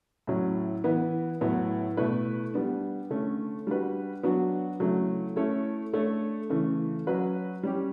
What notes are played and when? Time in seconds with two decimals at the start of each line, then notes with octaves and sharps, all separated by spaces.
0.27 A2 F#3 C#4
0.84 E3 B3 E4 B4
1.41 A2 F#3 B3
1.97 B2 A3 E4 B4
2.54 G3 B3 D4
3.10 D3 A3 C#4
3.67 G3 D4 F#4 B4
4.23 F#3 B3 D4 F#4
4.80 C#3 F#3 A3 E4
5.36 A3 C#4 E4 A4 C#5
5.93 A3 D4 A4 C#5
6.50 C#3 E3 A3
7.07 F#3 C#4 F#4 B4
7.63 G3 C#4 G4